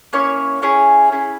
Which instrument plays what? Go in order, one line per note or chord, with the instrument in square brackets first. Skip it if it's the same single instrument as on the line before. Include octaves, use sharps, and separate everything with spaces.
[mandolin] A#3 C#4 E4 C#5
C#4 E4 G#4 C#5
C#4 E4 G#4